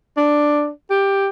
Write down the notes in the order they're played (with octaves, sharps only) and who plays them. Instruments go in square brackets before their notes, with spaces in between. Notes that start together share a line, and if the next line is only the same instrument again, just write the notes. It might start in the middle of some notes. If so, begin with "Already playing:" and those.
[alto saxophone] D4
G4